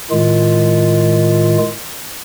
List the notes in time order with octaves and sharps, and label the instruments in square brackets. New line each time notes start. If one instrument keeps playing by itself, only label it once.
[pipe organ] A2 D#3 G#3 F4